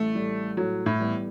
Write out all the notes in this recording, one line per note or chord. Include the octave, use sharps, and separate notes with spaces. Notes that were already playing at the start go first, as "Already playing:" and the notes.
Already playing: A1 A2 G3 A3
A2 G3
A2 F#3
A2
E3 G3 B3